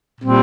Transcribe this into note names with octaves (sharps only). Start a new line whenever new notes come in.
A#2 G3 C4